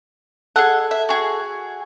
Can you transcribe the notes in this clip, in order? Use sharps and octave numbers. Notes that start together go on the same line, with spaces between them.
G#4 A4 D#5 F#5
E5
F#4 G#4